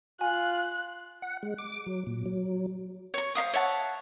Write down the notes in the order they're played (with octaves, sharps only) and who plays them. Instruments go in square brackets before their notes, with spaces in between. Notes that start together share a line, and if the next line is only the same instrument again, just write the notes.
[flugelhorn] F4 [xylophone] G#5 [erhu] F#6
[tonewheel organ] F#5
G#3
D6
F#3
A#2
F#3
[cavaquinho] C#5 C#6
C5 E5 F5 D#6
C#5 E5 F#5 A5